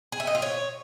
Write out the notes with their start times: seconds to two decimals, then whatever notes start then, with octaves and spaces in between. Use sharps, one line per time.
0.12 G#4
0.20 E5
0.27 D#5
0.35 F4
0.42 C#5